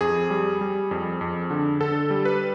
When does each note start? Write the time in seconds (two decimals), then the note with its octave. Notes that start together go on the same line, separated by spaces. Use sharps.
0.01 F2 G#4
0.30 G3
0.61 G3
0.91 F2
1.21 F2
1.51 D3
1.81 D3 A4
2.10 G3
2.25 B4